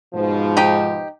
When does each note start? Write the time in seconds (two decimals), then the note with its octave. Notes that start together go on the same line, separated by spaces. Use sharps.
0.14 G#2 B2 F3
0.57 D#4 G4